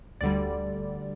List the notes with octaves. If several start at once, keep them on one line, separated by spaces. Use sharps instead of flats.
D2 D3 G3 D5